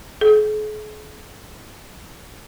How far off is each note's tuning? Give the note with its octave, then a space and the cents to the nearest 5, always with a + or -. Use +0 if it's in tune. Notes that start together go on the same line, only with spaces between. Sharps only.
G#4 +45